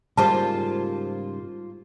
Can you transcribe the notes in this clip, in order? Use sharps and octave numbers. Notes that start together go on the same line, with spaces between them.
G#2 C#3 G3 A#3 F4 C5 A5